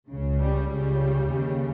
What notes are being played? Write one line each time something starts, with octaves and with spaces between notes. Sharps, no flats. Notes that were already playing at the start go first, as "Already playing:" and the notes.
C#2 C#3
G3
C#2 C#3 G3
D#2 C#3